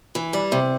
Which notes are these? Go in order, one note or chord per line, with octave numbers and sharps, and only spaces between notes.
E3
G3
C3